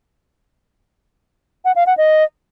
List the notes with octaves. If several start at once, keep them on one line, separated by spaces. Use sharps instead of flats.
F#5
F5
F#5
D#5